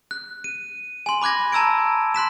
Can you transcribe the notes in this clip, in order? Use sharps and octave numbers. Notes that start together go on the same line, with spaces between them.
F#6
D#7
G#5 C6
B5 D6 F#6 G#6 A#6
A5 A#5 E6 G#6 D7
C6 F#6 B6 E7